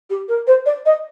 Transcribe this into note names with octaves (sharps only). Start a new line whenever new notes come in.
G4
A#4
C5
D5
D#5